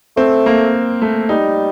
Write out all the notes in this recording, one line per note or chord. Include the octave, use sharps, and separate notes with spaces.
A3 C4
A#3
A3
G3 D#4